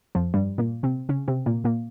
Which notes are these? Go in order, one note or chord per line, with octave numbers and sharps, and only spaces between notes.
F2 F3
G2 G3
A#2 A#3
C3 C4
C#3 C#4
C3 C4
A#2 A#3
A#2 A#3